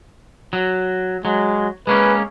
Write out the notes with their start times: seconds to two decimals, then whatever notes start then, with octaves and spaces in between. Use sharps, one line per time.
0.53 F#3
1.25 F#3 G#3
1.87 G#3 A#3 C#4 B4